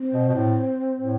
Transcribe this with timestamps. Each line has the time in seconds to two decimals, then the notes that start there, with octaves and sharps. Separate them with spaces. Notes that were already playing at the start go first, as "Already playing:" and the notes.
Already playing: C4
0.14 B2
0.29 B2
0.35 A2
1.00 A2